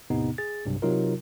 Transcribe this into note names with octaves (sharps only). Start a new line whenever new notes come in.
E2 A2 C3 B3 D#4
G#4 A6
B1 G2 C3
C3 F#3 D#4 F4 A#4